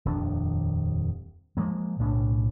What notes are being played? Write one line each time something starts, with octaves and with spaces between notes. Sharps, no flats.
D#1 F2 D#3 D4
F3 G#3 A#3
B1 A2 C#3 D4